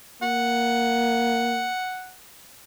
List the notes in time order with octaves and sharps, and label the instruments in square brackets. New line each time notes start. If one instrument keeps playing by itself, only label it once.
[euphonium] A#3 [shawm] F#5